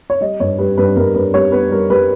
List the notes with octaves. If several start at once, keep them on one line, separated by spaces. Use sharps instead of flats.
C#5
G3 D#5
G2 C#5
G3 B4
G2 B4
G2 A#4
G2 B4
G3 C#5
B3 B4
G3 A#4
G3 B4